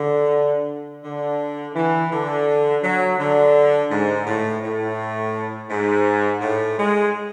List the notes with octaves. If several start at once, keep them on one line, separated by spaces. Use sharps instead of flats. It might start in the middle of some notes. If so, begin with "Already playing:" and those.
Already playing: D3
D3
E3
D3
F#3
D3
G#2
A2
A2
G#2
A2
G#3